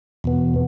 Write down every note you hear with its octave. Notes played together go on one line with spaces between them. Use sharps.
E2 B2 B3